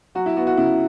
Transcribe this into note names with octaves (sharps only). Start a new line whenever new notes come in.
F#3 F#4
E4
B3 F#4
F#4
C#3 E4